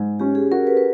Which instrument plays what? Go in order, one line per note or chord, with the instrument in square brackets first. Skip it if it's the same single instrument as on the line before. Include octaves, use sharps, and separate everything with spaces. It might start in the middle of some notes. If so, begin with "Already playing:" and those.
Already playing: [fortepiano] G#2
[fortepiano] C#4 [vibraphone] G4
[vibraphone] G#4
[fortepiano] F#4 [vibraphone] A#4
[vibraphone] B4
B4